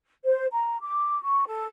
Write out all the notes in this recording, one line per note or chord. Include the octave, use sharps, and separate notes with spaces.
C5
A#5
D6
C#6
A4